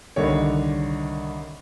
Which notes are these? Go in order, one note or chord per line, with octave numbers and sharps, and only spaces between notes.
C2 D3 D#3 C#5